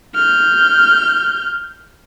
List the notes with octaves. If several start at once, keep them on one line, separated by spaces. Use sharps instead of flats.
F6 G6